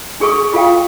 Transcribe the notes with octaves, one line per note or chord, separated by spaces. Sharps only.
D4 G#4 A4 C#6 D6
F4 A4 F5 G5